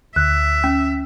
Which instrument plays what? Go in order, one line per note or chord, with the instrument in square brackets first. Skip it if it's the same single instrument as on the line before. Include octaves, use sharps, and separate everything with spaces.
[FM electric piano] D2 [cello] E5 [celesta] F#6
[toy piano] C#4